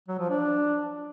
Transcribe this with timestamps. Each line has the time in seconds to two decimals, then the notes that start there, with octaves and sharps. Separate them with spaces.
0.08 F#3
0.19 F3
0.30 D4